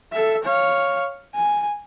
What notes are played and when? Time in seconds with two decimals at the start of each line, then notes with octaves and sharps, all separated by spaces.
0.13 A4 E5
0.44 C#5 F5
1.35 G#5